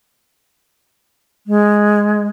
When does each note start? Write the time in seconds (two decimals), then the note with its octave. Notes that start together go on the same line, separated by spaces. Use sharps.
1.47 G#3